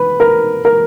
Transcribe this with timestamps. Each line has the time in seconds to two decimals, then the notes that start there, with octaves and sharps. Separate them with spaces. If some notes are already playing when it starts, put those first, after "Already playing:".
Already playing: B4
0.20 A#4
0.65 A#4